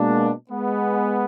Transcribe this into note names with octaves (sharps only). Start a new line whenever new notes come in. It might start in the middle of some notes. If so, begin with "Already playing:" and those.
Already playing: B2 G#3 A#3 D4
G#3 B3